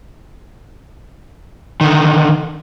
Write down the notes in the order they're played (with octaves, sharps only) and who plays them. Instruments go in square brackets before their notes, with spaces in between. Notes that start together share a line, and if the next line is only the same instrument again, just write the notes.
[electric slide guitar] D3 D#3